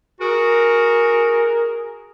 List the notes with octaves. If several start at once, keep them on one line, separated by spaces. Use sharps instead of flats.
F#4 G#4 A#4